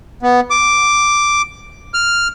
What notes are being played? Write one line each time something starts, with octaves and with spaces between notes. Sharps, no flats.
B3
D6
F6